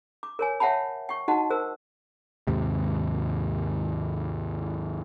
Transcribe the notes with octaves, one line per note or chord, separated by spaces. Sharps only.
D6
A#4 C#5 G#5
C#5 E5 F#5 G5 A5 B5
G5 C#6
D#4 F#4 D#5 F#5 A5
A#4 C5 E6
D#2 G#2 C3